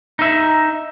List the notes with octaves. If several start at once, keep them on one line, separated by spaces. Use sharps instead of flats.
D#4 E5